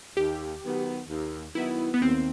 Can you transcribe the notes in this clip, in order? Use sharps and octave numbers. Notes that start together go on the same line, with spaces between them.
D#2 G4
D#3 F#3 B3
D#2
D#3 F#3 B3 E4
B3
D#2 C4